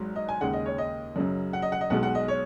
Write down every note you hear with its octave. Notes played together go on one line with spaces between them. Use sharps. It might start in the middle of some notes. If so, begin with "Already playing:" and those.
Already playing: G#1 G#2 F#3
D#5
G#5
D#2 C#3 G#3 F#5
D#5
C#5
D#5
F#2 C#3 F#3
F#5
D#5
F#5
D#5
B1 B2 G#3 F#5
F#5
D#5
C#5